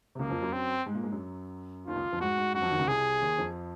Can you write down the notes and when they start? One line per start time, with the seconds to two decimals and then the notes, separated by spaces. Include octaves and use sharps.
0.15 C3
0.19 C#2 C#3 A#3
0.25 F#3
0.30 F2 F3
0.41 F#2 F#3
0.53 F#2 F#3 C4
0.86 G#2 G#3
0.95 A#2 A#3
1.03 G#2 G#3
1.12 F#2 F#3
1.87 D#2 D#3 F4
1.95 C#2 C#3
2.13 F2 F3
2.20 G#2 G#3 F#4
2.38 G#2 G#3
2.54 F#2 F#3 F#4
2.62 F2 F3
2.71 D#2 D#3
2.79 C#2 C#3
2.87 C2 C3 G#4
3.21 D#2 D#3
3.38 F2 F3